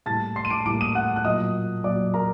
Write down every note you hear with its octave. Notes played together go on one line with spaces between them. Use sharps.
A2 G3 A#3 A5 A6
C6 C7
D#7
D6 D7
A2 G3 A#3 D6 D7
D#6 D#7
F#5 F#6
F#6
A#2 F#3 A#3 D#5 D#6
A#2 F#3 A#3 D5 D6
A#4 A#5